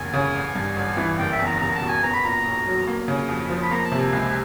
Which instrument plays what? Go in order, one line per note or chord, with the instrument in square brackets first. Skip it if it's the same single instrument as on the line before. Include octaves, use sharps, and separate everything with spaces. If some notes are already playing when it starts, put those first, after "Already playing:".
Already playing: [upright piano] F#1 E2 [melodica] G#5
[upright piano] C#3
A1
G2
A1
E3
[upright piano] F#1 [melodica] G5
[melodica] E5
[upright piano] E2
[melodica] A#5
[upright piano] F#1 [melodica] A#5
[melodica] A5
[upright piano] B2
[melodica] G#5
[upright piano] B3 [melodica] A#5
[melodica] B5
[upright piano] A#2 [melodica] A#5
[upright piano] B1
F#3
A#3
C#3
F2
F3
[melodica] B5
[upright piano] A#3 [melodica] A#5
[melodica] A5
[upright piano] C3
[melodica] G#5
[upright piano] C#2 [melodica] G#5